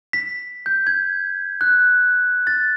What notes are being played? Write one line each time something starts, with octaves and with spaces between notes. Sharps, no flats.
B6
G6
G#6
F#6
A6